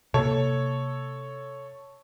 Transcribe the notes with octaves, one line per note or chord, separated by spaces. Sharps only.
C3 A#3 A4 C#5